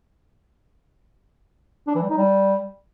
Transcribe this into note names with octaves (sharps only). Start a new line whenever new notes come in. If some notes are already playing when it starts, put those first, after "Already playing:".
D4
E3
G3
D#4
G3